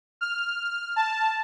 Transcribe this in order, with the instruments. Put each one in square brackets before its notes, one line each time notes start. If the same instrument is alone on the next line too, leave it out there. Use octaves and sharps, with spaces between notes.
[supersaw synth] F6
A5